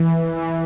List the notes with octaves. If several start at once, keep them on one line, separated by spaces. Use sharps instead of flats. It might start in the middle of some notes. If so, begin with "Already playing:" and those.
Already playing: E3
E3